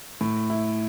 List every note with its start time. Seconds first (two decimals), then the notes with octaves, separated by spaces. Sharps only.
0.21 A2
0.50 E4